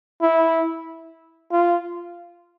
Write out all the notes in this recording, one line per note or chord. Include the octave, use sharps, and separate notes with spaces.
E4
F4